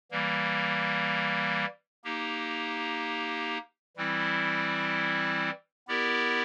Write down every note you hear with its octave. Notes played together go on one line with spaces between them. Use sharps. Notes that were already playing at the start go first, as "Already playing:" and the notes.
E3 G3 A#3
A#3 D#4 G4
E3 G3 C4 E4
B3 E4 G4 A#4 D5